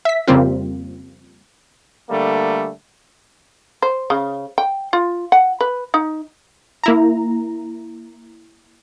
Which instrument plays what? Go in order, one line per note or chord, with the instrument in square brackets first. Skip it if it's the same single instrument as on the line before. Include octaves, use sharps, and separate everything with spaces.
[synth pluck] E5 B6
F2 C#3 G3 A#3 C4 F4
[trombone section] D3 G3 A3 A#3
[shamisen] C5
C#3
G5
F4
F#5
B4
D#4
[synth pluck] A#3 E4 A#5